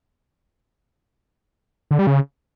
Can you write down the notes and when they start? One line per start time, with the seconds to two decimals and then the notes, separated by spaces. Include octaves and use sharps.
1.91 D3
1.99 G3
2.07 C#3